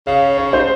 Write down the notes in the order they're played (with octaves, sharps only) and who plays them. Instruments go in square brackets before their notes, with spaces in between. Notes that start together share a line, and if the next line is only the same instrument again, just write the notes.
[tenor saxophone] C#3 [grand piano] F5
[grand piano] C#5
C5